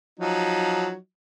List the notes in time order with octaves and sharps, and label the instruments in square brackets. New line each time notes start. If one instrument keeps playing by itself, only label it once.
[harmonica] F3 F#3 D#4